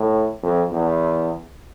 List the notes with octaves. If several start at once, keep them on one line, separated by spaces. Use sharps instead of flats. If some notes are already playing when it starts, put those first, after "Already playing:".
Already playing: A2
F2
E2